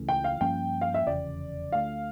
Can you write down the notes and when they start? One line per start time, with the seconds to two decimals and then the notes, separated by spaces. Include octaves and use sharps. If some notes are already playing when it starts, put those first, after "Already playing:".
Already playing: C#2 C#3 E3 A3
0.09 G5
0.24 F5
0.41 G2 F3 A#3 C#4 G5
0.81 F5
0.94 E5
1.07 F1 E2 C#3 D5
1.72 D2 D3 A3 F5